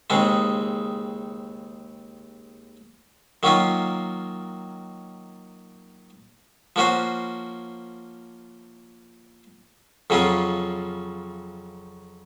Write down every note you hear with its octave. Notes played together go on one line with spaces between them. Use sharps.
D#2 C#3 G#3 C4
D#3 F#3 A#3 C#4 F4
F3 A#3 C#4 F#4 C5
F2 C#3 F#3 C#4 F4